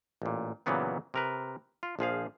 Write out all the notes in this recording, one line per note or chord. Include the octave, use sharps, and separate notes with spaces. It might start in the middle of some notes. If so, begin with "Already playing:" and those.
A1 A#2
A#2 C#3 E3 F#3 B3 C4
C3 A#4 B4
F4
A#1 F3 G#4 F5